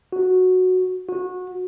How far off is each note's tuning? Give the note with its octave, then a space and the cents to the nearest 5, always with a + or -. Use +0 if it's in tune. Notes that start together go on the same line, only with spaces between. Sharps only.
F#4 -5
F#4 -25